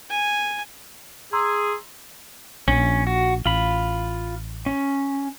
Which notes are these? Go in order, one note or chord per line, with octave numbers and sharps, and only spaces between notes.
G#5
G#4 A#5 C6 E6
A#1 C#4
F#4
A1 F4 B5
C#4